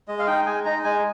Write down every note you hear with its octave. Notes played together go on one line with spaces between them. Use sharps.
G#3 D#5
F5
D#4 G5
G#3 G#5
D#4 A#5
G#3 G#5